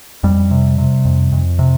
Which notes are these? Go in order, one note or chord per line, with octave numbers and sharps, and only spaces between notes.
F2 G3
C3
C3
F2
F2
C3